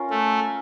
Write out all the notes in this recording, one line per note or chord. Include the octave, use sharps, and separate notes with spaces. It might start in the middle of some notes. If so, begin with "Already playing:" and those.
Already playing: C#4 F4 A#4
A3